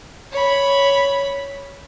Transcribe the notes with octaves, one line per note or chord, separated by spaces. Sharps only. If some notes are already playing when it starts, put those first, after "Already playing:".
C#5 B5